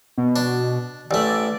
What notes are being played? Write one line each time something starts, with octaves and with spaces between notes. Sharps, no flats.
B2
D4
A1 A3 D5